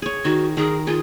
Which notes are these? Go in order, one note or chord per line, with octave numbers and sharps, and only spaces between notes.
G#4 C#5
D#3 F#4
D#3 G#4 A#4
F4 G#4